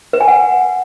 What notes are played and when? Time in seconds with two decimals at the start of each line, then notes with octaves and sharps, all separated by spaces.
0.13 B4
0.21 G#5
0.28 F#5